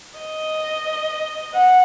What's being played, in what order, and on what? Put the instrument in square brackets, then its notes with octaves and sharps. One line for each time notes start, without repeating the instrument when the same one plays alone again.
[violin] D#5
F#5